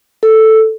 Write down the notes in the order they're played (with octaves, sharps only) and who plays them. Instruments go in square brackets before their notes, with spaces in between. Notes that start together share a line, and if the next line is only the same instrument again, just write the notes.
[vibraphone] A4